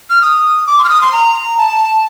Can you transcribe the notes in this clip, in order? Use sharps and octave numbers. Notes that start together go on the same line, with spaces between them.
F6
D#6
D6
C6
F6
D#6
C6
A#5
A5